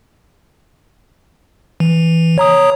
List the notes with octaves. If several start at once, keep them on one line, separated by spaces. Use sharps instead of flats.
E3
C#5 A#5 D#6